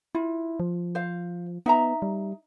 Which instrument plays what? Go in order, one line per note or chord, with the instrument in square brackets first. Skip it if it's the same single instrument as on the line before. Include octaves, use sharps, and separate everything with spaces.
[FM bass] E4 [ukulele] F4
[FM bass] F3
[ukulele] C5 F5
[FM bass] B3 [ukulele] D#4 E5 A#5
[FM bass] G3